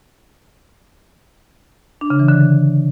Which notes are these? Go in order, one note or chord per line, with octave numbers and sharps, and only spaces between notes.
D4
C#3
E3
D3